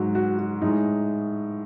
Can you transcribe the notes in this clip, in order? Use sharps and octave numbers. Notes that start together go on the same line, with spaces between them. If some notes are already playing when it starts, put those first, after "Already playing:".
Already playing: G#2 F#3 F#4
F#4
F#4
A2 G#3 D#4